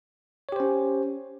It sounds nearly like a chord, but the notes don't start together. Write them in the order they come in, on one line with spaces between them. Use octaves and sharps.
C#5 G4 C5 C#4